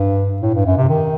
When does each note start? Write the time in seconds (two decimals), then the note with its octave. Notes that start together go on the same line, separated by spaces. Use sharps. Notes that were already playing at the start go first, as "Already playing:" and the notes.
Already playing: G2
0.42 A2
0.54 G2
0.66 F#2
0.78 C3
0.89 D#3